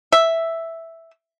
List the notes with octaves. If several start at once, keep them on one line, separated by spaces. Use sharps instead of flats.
E5